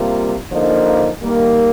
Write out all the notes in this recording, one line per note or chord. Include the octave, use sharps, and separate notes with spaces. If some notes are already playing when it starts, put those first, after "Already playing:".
Already playing: C3 G3 A#3 F4
D3 F3 A#3 D#4
D#3 G3 A#3